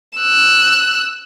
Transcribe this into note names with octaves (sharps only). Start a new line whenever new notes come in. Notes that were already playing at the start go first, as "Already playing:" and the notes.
E6 F#6